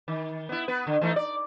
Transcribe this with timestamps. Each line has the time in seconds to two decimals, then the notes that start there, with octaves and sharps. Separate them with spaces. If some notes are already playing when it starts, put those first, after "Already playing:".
0.08 D#3
0.49 B3 E4
0.68 B3 B4
0.87 D3
1.01 E3 A3 D#4
1.16 D5